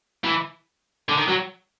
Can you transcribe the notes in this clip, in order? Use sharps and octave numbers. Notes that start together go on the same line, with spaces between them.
E3
D3
D#3
F#3